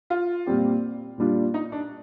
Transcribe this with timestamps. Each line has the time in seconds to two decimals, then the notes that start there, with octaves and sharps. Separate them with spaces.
0.10 F4
0.46 A#2 G3 C4 G4
1.18 A#2 G3 D4 F4
1.54 D#4
1.72 D4